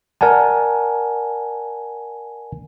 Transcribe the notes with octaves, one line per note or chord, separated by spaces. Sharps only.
A#4 D5 F#5 G#5 A5